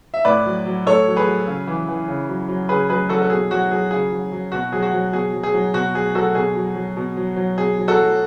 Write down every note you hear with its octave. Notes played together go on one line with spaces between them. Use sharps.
E5
A2 B4 D5
F#3
F#3
A2 A4 C#5
F#3
G#4 B4
F#3
C#3
E3
E3
C#3
F#3
F#3
C#3 G#4 B4
F#3 G#4 B4
F#3 F#4 A4
A4
B2 G#4
F#3 F#4
F#3 G#4
C#3 G#4
F#3
F#3
B2 F#4
F#3 G#4
F#4
F#3
B2 G#4
F#3
G#4
F#3
B2 F#4
F#3 G#4
F#3 F#4 A4
B2 G#4
F#3
F#3
B2
F#3
F#3
B2 G#4
F#3
F#4 A4
F#3